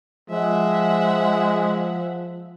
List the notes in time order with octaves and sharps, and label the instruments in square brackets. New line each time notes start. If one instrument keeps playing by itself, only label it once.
[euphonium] F3 [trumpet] G#3 [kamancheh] E5 F#5